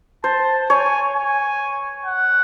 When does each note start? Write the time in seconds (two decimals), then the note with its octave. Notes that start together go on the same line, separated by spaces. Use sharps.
0.24 C5 A5
0.70 C#5 G#5
1.15 G#5
2.05 F#5